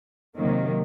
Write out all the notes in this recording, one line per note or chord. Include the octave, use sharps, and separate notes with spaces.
C3 D#3 F#3 A#3